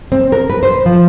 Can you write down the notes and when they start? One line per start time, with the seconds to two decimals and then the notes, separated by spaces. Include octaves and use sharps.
0.12 C4
0.32 A#4
0.50 B4
0.63 C5
0.86 F3